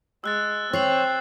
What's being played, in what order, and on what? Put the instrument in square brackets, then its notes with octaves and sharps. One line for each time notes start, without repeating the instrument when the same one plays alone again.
[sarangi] G#3 [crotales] E6 F#6 A6
[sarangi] C4 [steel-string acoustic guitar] C#5 [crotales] A6 C7 F#7